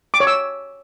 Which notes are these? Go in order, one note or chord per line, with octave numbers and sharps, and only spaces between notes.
D6
C#5
E6